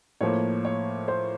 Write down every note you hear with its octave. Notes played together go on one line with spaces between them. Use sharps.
A2 F3 A#3 C#5
C#5
C5